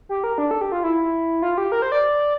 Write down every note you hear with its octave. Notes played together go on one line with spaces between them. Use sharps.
G4
A#4
D4
A4
G4
F4
E4
F4
G4
A#4
C5
D5